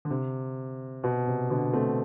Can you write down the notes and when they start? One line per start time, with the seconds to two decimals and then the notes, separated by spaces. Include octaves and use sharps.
0.05 D3
0.10 C3
1.04 B2
1.27 C3
1.50 B2 D3
1.73 A3 C4